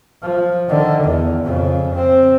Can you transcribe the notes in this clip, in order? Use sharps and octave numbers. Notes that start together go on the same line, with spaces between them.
F3
D3 D#3
E2
F2 C#3
C4